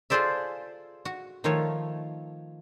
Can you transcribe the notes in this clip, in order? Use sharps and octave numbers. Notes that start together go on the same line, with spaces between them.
F4 G#4 A4 C5 D5 E5
F#4
D#3 F3 A3 F4 C#5